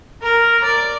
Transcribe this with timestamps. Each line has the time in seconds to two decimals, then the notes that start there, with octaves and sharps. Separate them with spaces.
0.22 A#4
0.65 D5